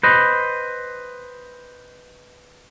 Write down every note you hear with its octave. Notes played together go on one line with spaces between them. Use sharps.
B4 C5 D#5